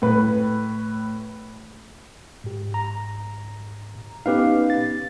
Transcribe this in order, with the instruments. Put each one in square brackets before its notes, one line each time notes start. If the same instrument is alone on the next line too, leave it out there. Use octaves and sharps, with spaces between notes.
[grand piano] A2 B4
[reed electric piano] G#2 G4
[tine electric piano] A#5
[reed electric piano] B3 C#4 D#4 [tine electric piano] G4 B4 F5
[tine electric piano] A6